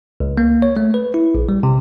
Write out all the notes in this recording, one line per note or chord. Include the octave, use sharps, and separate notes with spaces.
C#2
A#3
C#5
A3
B4
E4
A#1
G3
C3